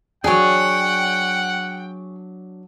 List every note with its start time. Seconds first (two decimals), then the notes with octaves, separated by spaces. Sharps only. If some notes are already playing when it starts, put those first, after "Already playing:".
0.24 F#3 D4 G#4 C#5 F#5 G5